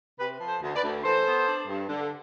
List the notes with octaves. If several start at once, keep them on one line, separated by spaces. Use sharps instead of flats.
C3 G4 B4
F3
A4 C5
D2
B4 D5
D2
E3 A4 C5
B3
D4
G2
D3